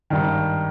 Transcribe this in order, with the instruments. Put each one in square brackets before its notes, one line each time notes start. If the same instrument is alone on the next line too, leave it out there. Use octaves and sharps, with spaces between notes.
[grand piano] G#1 G2 D#3